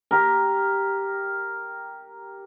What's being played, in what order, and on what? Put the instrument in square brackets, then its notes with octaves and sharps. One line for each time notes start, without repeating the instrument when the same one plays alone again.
[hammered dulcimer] G4 A#4